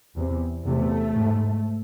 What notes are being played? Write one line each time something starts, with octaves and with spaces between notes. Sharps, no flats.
E2 C3
E2 C3 A3
G#2